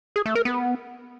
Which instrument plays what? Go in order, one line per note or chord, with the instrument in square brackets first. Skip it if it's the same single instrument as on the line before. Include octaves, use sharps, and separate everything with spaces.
[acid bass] G#4
A3
A#4
B3